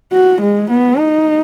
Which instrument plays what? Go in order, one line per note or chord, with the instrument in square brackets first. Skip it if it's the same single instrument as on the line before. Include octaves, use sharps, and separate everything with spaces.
[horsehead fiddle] F#4
G#3
B3
D#4